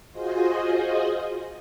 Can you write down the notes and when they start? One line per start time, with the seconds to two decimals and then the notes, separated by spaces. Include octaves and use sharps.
0.12 F4 F#4 G#4 C5 D#5